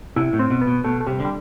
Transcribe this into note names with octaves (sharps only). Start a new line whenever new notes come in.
C3 E4
A2
C4
B2
B3
B2
B2 A3
A3
C3 G3
D3
G3